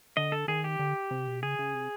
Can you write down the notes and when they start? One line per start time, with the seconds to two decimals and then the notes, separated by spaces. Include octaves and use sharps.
0.17 D3 D#5
0.32 A4
0.48 D#3 G#4
0.64 G4
0.79 D3
1.11 C3
1.27 B2
1.43 C#3 G#4
1.59 C#3
1.74 C3